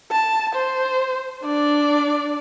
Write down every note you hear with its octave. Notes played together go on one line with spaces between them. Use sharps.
A5
C5
D4 D5